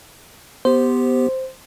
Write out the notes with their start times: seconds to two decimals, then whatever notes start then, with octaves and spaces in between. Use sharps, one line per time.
0.65 B3 G4 C5